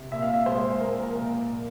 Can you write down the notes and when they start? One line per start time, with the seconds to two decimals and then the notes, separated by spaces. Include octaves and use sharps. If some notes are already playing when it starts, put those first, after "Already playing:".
Already playing: C3
0.12 A#2 E5
0.22 F5
0.34 E5
0.46 G#3 C5
0.81 A#2 A#4
1.03 A#4
1.15 A#2
1.50 A#2